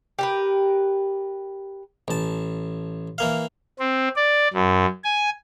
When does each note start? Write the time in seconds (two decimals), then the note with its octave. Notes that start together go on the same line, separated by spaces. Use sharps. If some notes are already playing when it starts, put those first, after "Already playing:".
0.19 G4 A#4 B4
2.08 A1 A5
3.18 E3 A#3 F5
3.79 C4
4.16 D5
4.54 F#2
5.04 G#5